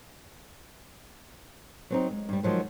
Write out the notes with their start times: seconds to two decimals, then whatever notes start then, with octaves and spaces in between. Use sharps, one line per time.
1.90 F#3 C4 D#4
2.10 G#3
2.29 G2 G3
2.43 D#3 F3 F#3 G#3